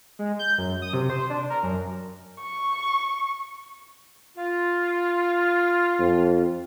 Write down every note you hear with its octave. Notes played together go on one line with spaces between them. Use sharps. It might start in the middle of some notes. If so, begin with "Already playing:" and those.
G#3
G6
F#2
D#6
C3
C5
D4
A#4
F#2
C#6
F4
F2